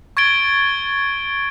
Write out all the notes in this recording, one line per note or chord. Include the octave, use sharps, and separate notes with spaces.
C#6 G#6 A6 D7 G7